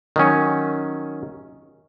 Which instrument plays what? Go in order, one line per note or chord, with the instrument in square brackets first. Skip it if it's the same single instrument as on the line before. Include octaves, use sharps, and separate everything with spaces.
[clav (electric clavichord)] D#3 F#3 C#4